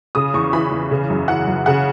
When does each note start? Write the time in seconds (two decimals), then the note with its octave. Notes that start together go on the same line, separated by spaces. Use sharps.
0.15 C#3 D#6
0.34 E2 C#6
0.53 E3 B5
0.71 E2
0.91 C#3
1.10 F#2
1.28 E3 F#5
1.47 F#2
1.66 C#3 F#5